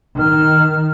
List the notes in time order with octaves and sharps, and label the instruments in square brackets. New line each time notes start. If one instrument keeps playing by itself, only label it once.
[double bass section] D#3 [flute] F6